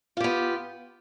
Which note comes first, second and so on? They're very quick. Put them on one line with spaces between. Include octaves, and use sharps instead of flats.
F4 G4 B3